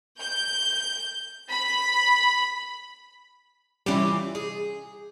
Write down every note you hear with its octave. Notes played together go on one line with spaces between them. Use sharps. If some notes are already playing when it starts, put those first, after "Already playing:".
G6
B5
E3 G3 C#4 E4 F4 G4
G#4